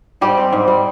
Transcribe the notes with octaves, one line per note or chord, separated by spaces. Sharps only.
G#2 G3 G4
C4
G#2
G3